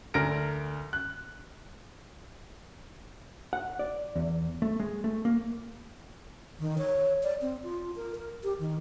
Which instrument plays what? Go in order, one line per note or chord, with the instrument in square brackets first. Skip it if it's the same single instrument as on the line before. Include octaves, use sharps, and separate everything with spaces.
[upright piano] D2 A#4 F6 A#6 D7
F#6
[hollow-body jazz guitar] F#5
D5
E2
A3
G#3
A3
A#3
[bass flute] D#3
C#5
D5
C4
F4
A#4
A#4
G4
D#3